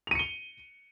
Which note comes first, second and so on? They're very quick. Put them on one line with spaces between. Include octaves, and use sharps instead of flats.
F7 D#7 C#7 G7